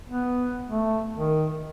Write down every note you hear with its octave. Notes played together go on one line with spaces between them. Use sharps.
B3
A3
D#3